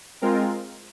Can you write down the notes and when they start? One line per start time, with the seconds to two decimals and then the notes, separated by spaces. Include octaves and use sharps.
0.22 G#3 C4 F4 A#4